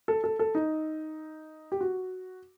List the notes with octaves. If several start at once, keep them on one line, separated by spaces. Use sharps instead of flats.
A4
A4
A4
D#4
G4
F#4